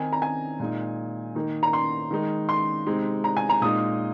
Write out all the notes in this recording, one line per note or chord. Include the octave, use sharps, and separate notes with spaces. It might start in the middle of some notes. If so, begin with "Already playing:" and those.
Already playing: D#3 C4 D#4 G#5
A#5
G#5
A#2 G#3 D#4
D#3 A#3 D#4
A#5
C6
D#3 G#3 D#4
C6
C3 G#3 C4 D#4
A#5
G#5
A#5
A#2 G#3 D#4 D#6